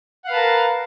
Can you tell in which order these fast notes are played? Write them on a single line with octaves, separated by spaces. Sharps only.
F#5 F5 B4 A5 A#4